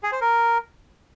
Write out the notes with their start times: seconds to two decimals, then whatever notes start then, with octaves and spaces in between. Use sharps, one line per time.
0.03 G#4
0.12 C5
0.21 A#4